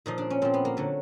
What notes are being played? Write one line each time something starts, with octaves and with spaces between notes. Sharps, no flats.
A#2 F3 D#4
D4
C#4
A#2 F3 C4
B3
A#3
D3 F#3 A3